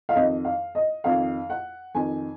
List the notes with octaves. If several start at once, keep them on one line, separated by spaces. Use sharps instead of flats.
F5
F2 D#3 D#5
F5
D#5
F2 D#3 F5
F#5
F2 D#3 G#5